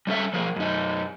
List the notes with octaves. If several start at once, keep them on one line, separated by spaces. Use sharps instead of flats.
G3 C#4 A4 E5
F3 G#4 A#4
F#2 D#4